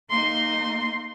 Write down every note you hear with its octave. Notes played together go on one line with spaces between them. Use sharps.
A#3 D#4 C6